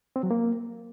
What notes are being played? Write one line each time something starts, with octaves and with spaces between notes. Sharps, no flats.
C4
F#3
A#3